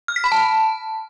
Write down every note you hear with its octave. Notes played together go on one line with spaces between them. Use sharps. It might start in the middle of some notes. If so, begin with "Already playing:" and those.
F6
B6
B5
A5